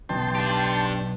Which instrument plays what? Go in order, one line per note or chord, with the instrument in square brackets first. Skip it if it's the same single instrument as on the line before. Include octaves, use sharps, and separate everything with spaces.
[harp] B1 [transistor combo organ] G5 A5 C6
[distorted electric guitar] D4 G4